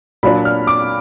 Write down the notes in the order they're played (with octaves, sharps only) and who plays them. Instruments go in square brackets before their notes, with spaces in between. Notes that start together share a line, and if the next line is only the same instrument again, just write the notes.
[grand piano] A#2 F#3 D4 [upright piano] B5
[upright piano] F6
D6